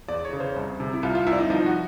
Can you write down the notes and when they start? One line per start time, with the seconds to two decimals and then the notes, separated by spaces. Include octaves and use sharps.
0.08 E2 D5
0.25 C#5
0.33 C#3
0.40 C5
0.56 C2
0.80 C3
0.93 E4
1.03 C2 F4
1.15 F4
1.27 C2 E4
1.33 D4
1.39 D#4
1.50 F3 D#4
1.66 F#4